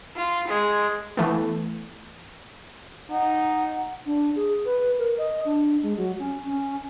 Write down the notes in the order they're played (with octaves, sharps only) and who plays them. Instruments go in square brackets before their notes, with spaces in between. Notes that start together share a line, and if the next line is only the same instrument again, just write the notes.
[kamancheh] F4
G#3
[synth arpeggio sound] E3 A3 B3
[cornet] D#4 [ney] F#5
[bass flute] D4
G#4
B4
A#4
D#5
D4
G#3
F#3
C#4
C#4